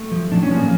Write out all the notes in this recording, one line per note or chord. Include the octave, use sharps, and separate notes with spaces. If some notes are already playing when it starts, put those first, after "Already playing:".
Already playing: A3
F3
A2 D4
C#4
F3
A#3